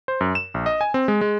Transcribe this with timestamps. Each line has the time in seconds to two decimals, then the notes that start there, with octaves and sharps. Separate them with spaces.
0.08 C5
0.21 F#2
0.35 E7
0.54 A#1
0.66 D#5
0.81 G#5
0.94 C4
1.08 G#3
1.21 G#3